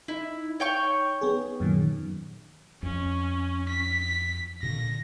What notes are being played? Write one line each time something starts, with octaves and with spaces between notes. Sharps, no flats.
D#4 E4
C#5 G5 C#6
B3 G#4
F#2 A#2 D#3
F2 C#4
B6
A#2 D3 A#6